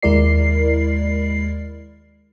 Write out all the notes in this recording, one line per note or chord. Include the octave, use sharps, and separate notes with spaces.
D#2 G#3 E4 A#4 D5 C7